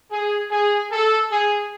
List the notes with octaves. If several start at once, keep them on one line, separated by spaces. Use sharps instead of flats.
G#4
G#4
A4
G#4